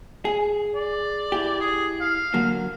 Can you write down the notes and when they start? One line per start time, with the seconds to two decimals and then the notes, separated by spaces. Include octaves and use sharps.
0.25 G#4
0.75 D5
1.32 E4 G4
1.61 G#4
2.01 F5
2.34 D3 F#3 A#3